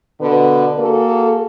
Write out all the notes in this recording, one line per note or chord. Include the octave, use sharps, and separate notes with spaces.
B2 D3 B4
A#3 F#4 G#4 A4